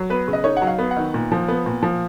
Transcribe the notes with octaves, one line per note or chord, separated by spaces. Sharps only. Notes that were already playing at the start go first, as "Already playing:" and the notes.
Already playing: F#3
B3 B4
C#3
D#5
D#4 C#5
F#5
F#3
F5
B3
F#5
D#3
A#2
F3
B3
A#2
F3